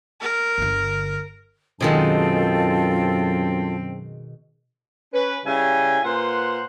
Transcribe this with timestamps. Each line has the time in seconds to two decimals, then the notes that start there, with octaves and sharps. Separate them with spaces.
0.21 A#4
0.58 G1 D3
1.80 F#2 B2 D#3 G#3 C4 F4 A4 A5
5.13 C#4 B4
5.46 C#3 G3 E4 G#5
6.04 A#2 B4 C5 F#5 C6